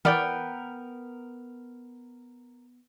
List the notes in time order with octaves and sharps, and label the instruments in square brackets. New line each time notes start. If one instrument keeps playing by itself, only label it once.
[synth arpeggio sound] E3 D5 [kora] B3 G5 [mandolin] A#4